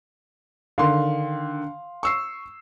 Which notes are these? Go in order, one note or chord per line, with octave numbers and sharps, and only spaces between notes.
D3 D#3 F5 C6
C#6 E6 C7